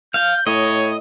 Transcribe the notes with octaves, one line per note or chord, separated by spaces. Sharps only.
F5 G6
A2 C#5 D#5